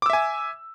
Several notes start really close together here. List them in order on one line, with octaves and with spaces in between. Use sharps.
D6 E6 E5 G#5